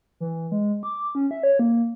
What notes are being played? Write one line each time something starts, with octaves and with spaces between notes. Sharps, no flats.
E3
G#3
D6
C#4
E5
C#5
A#3